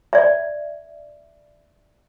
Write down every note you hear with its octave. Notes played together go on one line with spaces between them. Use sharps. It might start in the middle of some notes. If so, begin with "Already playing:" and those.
D5 E5